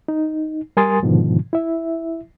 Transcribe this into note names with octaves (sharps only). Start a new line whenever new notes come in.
D#4
G3 A#4 G#5 C6 D#6 A6
G#2 B2 D3 D#3 F3
E4 E5